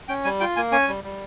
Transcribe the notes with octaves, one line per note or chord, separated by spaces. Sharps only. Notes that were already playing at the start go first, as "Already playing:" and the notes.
C#4 G5
G3 G#5
F4 G5
A#3 G#5
C#4 G#5
G3
G3